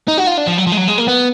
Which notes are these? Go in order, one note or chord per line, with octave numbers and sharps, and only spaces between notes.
D#4
F#4
F4
D4
F3
F#3
F3
G#3
F#3
G#3
A#3
B3